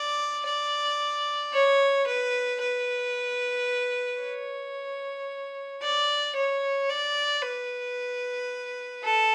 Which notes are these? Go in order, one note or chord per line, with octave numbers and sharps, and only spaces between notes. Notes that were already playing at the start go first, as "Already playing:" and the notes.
Already playing: D5
D5
C#5
B4
B4
C#5
D5
C#5
D5
B4
A4